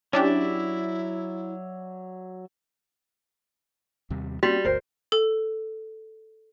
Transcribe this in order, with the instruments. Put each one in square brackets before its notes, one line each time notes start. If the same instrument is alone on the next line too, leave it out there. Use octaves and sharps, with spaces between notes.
[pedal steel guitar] F#3 D5 E5 [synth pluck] C#4 D4 G4 [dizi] E4
[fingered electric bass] D#2 C3 G3
[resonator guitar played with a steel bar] G3 [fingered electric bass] A#3 C4 C#4 [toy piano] F#4
[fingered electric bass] G1 D2 [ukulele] A#4 C5
[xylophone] A4